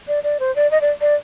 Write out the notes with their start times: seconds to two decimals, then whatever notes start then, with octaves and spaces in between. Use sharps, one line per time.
0.08 D5
0.24 D5
0.40 C5
0.56 D5
0.71 D#5
0.81 D5
1.01 D5